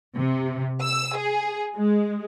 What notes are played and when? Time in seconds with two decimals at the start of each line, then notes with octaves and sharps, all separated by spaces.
0.17 C3
0.82 E6
1.17 G#4
1.76 G#3